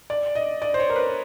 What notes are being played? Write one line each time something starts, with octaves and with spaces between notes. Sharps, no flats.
D5
D#5
D5
C5
C#5
A#4
B4